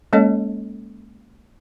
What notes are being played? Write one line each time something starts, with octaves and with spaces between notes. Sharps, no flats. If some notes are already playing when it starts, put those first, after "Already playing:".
G#3 A#3 C#4 A4 C#5 D#5